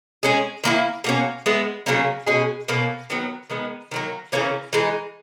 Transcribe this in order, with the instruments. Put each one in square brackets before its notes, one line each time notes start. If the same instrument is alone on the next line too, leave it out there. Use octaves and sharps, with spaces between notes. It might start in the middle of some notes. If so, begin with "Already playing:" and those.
[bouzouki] G#3 C#4 G#4
D#3 A#3 C#4 E4
B2 A#3 C#4
G#3 B3 E4
C#3 F#3 A#3 C#4
B2 G#3 C#4 G#4
B2 A#3 C#4
D#3 F#3 B3
D#3 G#3 B3
D#3 F#3 A#3
C#3 E3 A#3 C#4
E3 G#3 D#4